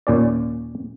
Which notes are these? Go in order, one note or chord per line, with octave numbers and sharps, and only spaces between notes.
D#2 A#2 C#4 D5